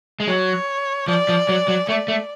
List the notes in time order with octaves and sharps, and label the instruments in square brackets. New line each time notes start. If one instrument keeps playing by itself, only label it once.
[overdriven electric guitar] G#3
[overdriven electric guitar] F#3 [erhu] C#5
[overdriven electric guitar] F3 [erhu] D5
[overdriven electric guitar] F3
F#3
F#3
[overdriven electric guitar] A3 [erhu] D5
[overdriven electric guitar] A3